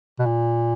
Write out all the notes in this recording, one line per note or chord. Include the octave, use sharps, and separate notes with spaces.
B2
A#2